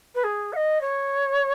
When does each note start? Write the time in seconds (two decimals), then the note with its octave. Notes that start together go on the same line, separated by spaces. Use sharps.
0.15 B4
0.24 G#4
0.53 F#5
0.56 D#5
0.81 C#5